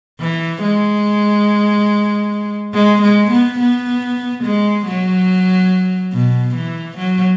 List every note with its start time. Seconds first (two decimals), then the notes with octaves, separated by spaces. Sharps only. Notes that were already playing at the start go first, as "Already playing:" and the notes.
0.20 E3
0.62 G#3
2.74 G#3
3.02 G#3
3.31 B3
3.59 B3
4.43 G#3
4.86 F#3
6.13 B2
6.55 E3
6.97 F#3